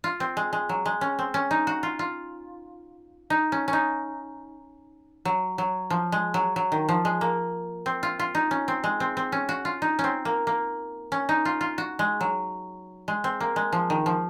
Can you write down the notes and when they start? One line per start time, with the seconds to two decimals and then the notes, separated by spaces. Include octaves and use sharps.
0.04 F4
0.20 C4
0.37 G#3
0.53 G#3
0.69 F#3
0.85 G#3
1.01 C#4
1.19 C4
1.34 C#4
1.51 D#4
1.67 F#4
1.83 F4
1.99 F4
3.30 D#4
3.52 C#4
3.68 C#4
3.73 D#4
5.25 F#3
5.58 F#3
5.90 F3
6.12 G#3
6.34 F#3
6.56 F#3
6.72 D#3
6.89 F3
7.05 G#3
7.21 A#3
7.86 C4
8.03 F4
8.19 F4
8.35 D#4
8.51 C#4
8.68 C4
8.84 G#3
9.00 C4
9.17 C4
9.32 C#4
9.49 F#4
9.65 F4
9.82 D#4
9.99 C#4
10.04 C4
10.25 A#3
10.47 A#3
11.12 C#4
11.29 D#4
11.45 F4
11.61 F4
11.78 F#4
11.99 G#3
12.21 F#3
13.08 G#3
13.24 C4
13.40 A#3
13.56 G#3
13.73 F3
13.90 D#3
14.06 F3